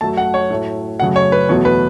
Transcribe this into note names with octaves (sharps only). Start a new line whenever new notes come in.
F#2 F#3 A3 A5
F#5
C#5
A2 F#3 A3
F#2 C#3 F#3 A3 F#5
C#5
B4
E2 B2 F#3 A3 C#5
B4